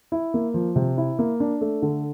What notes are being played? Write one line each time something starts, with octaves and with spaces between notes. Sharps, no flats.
E4
A#3
F3
C3
E4
A#3
D4
A3
D3